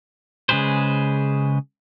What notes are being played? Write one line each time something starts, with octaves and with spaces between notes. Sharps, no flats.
C#3 G#3 G#4 B4 C5